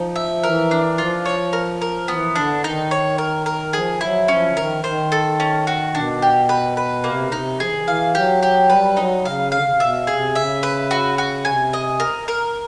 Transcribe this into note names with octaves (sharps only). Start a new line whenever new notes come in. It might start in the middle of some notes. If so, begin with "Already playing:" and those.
Already playing: F3 D#4
E5
E3 A#4
D4
F3 F4
C#5
A#4
A#4
E3 B3
D3 D4
D#3 D#4
C#5
A#4
A#4
F3 G#4
F#3 E4
F3 C#4
D3
D#3 A#4
D#3 C5
A4
C#4
F#4
B2 D4
G4
B4
B4
C3 A#3
C#3
C3 D#4
F3 G#4
E3
D#3
E3
F5
F#3 G4
G4
G3 B4
F#3 D#4
C#3 F5
D3 F5
C#3
C3
B2 E5
C3 G#4
C#3 E5
B4
F#4
F#4
C3 G#5
D#5
A#4
A#4